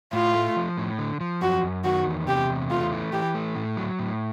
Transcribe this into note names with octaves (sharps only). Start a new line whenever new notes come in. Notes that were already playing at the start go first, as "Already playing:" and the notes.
A2 F4
A3
F3
A2
D3
F3
F#2 F#4
F#2
D#3 F#4
E2
C3 G4
E2
A3 F4
E3
E3 G4
A3
A2
F#3
A2